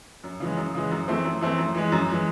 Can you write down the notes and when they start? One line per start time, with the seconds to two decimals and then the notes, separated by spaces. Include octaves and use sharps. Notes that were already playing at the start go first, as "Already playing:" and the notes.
0.24 F#2
0.40 C#3 E3 G#3
0.57 F#2
0.74 C#3 E3 G#3
0.91 F#2
1.08 E3 A3 C4
1.25 F#2
1.41 E3 A3 C4
1.58 F#2
1.74 E3 G#3
1.92 F#2
2.09 E3 G#3